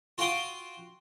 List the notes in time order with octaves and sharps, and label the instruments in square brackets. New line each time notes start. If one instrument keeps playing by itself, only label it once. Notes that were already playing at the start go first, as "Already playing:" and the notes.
[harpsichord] F4 F#4 F5 G5 C6 D#6